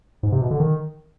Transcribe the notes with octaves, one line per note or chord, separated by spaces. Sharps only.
G#2
C3
B2
D3
D#3